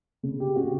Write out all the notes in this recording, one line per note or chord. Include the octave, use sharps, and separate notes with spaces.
C#3
G4
C#3 F#4